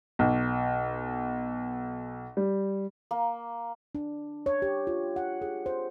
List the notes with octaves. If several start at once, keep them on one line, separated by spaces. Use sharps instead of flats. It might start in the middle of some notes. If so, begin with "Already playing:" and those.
B1
G3
A#3
D4
C#5
G4
F4
F#5
G#4
C5